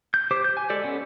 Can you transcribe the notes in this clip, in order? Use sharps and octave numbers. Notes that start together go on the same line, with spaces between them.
G6
G4 C5 D6
G6
G#5
G#3 G4 A4 D5
B3 C#4 A4